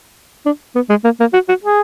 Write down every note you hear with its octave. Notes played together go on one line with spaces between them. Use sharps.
D4
B3
G#3
A#3
A#3
F#4
F#4
G#4